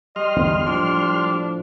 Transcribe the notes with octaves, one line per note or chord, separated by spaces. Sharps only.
G3 D#5 C6 F6
G1 E2 D3
A2 F3 D4